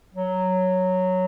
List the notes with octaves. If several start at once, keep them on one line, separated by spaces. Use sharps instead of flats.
F#3